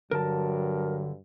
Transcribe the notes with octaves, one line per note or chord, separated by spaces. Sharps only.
G2 D3 F#3 A#4 A5